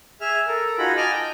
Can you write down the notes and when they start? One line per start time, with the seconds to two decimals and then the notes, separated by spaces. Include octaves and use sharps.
0.21 G#4 E5 F6
0.47 A4 A#4
0.78 D#4 F4 F#4 G#4 A#5 B5
0.97 D#5 G#5 A5 D6 F6
1.12 G5